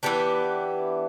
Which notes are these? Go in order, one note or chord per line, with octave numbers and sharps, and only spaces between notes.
E3 B3 D4 G4